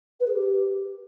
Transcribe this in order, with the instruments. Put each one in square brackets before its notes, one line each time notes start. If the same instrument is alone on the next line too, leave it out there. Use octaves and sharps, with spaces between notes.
[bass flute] B4
G#4
G4